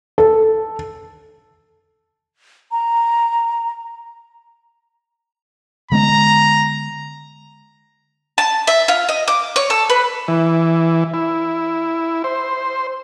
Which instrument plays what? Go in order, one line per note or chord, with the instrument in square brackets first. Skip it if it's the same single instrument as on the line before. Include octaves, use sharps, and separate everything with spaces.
[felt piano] A4
[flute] A#5
[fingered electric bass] D3 G#3 B3 [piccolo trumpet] A#5
[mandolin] A5
E5
F4
D#5
D6
C#5
A4
B4
[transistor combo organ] E3
E4
C5